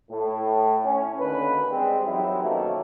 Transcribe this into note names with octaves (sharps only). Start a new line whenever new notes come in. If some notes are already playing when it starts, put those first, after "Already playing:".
A2
C#4
D#2 D3 B4
G3 G#3 C4
F#2 E3 F#3 D#4 E4 G4
B2 D#3 F3 F#3 A3 A#3